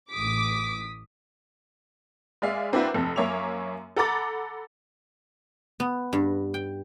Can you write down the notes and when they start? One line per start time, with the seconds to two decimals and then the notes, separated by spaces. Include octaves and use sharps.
0.11 A1 D6 D#6 B6
2.42 G#3 D5 E5 F5
2.72 A#3 C4 D4 E4 F#4 B4
2.94 F1 F2 A5
3.16 F#2 A#3 C#5 E5 D6 F7
3.97 A4 F#5 A#5 B5 D6 A6
5.80 B3
6.13 G2
6.54 G5